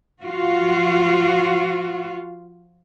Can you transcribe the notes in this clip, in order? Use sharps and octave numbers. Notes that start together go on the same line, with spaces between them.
F3 F4 F#4